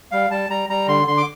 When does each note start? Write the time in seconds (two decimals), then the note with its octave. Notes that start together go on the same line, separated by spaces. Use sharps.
0.11 G3 F5
0.30 G3 A5
0.50 G3 A#5
0.69 G3 A#5
0.88 D3 C6
1.07 D3 C6
1.17 D6